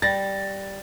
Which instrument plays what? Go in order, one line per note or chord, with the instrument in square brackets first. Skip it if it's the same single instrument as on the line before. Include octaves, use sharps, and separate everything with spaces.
[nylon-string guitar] G3 [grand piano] A6 A#6